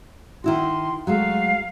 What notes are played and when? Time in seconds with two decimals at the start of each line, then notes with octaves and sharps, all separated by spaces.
0.44 D#3 E4 F#4 C6
1.07 F#3 G#3 A3 F5